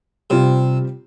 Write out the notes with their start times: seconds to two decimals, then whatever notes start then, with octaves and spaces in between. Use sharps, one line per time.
0.30 C3 G3 C4 F4